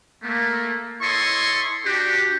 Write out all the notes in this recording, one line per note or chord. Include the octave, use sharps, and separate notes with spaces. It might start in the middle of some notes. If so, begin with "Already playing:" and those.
A3 A#3
E4 A4 C#5 D#5 C6 C#6
D4 F#4 G4